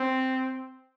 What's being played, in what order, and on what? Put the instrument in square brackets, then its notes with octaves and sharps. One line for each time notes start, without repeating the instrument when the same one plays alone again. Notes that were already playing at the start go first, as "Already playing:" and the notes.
Already playing: [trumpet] C4